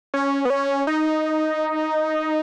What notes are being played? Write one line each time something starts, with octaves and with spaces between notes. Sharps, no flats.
C#4
B3
C#4
D#4